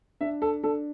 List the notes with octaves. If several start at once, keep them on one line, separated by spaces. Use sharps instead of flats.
D4 E5
A4
D4 A4